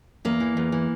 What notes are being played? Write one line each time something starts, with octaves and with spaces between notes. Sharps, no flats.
E2 A#3
E3
E2
E3